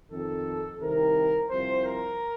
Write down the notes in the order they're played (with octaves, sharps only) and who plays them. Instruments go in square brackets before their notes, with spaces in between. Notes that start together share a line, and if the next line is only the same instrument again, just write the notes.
[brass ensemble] F2 D#3 A4
C2 C3 D#3 A#4
C2 C3 F3 C5
A#4